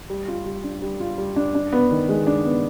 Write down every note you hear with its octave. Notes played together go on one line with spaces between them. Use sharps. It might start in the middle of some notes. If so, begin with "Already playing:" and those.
G3
F4
G3
D4
G3
F4
G3
D4
D4
B3
D#3
G#3
D4
B3